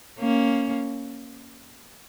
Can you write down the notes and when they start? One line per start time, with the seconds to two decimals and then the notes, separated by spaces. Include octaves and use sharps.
0.19 A#3 C#4